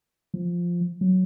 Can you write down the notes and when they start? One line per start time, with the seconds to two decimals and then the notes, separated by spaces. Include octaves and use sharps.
0.34 F3
1.01 F#3